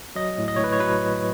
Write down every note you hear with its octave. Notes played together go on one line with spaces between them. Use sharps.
F#3 D#5
A2
D#5
A2 C#5
B4
C#5
F#3 B4